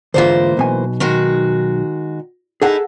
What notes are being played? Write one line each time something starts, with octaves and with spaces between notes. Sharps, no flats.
D2 G#2 E3 A#3 F4 C5
B1 B2 G#5
D#3 G#3 F#4
D#4 E4 G#4 A4 F#5